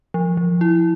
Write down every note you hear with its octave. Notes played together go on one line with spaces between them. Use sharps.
F3
F3
E4